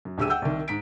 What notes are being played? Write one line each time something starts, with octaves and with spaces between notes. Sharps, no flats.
F#2
D#1 D2 G4 G#4 E6 D#7
F#5 G5 E6 G6
C2 D#3
G#2 B6 D7